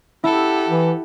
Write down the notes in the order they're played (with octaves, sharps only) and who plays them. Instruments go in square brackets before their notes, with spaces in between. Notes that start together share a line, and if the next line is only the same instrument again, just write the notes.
[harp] E4 [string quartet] G4 A4 F#5
[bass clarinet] E3